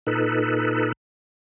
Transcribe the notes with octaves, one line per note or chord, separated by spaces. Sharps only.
A#2 D#4 A4 B4